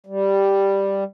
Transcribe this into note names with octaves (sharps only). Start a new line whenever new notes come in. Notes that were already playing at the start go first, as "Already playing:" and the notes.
G3